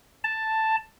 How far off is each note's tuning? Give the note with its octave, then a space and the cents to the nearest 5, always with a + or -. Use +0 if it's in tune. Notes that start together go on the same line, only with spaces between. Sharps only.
A5 +5